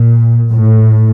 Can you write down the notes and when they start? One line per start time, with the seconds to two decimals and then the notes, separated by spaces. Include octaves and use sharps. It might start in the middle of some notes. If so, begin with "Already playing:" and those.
Already playing: A#2
0.51 A2